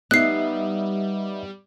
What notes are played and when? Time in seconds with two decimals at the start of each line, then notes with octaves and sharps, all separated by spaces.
0.11 G3 B3 D#4 D#5 E5 F#6 C7